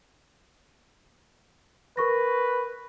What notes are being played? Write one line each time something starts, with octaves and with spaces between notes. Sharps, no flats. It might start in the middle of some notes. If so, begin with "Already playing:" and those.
A#4 B4 C#6 A#6